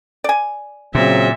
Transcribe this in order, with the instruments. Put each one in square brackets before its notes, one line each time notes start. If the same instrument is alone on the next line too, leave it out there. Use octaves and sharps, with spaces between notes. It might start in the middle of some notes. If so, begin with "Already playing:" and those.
[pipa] D5 G#5
[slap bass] A#2 [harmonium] C#3 F#3 C4 [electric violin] E5